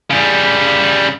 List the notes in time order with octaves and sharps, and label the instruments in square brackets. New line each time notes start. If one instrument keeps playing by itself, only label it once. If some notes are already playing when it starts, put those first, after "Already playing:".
[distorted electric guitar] C#3 G3